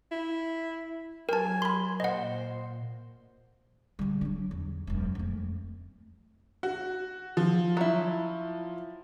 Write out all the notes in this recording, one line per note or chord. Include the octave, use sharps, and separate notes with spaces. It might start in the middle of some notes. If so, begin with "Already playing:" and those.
E4
F#3 A#4 G#5 A5
B5 C6
A#2 C5 D#5 F#5
D3 G3
F#3 D4
E2
E1 F#2
F2 A3
F#4
F3
F#3 E4